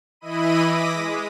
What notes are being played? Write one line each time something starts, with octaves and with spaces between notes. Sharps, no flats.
E3 E4 D#5 B5 D#7
D6 D#6 A#6 B6
G#3